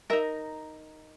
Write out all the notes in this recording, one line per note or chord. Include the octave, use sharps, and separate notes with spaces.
D#4 A#4 E5